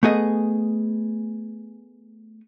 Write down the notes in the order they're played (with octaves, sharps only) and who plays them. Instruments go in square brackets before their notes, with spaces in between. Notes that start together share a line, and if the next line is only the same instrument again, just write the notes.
[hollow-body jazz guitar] A3 B3 G#4 D#5